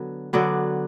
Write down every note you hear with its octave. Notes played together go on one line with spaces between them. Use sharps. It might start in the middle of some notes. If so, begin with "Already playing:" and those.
Already playing: D3 F#3 B3
D3 F#3 B3 D5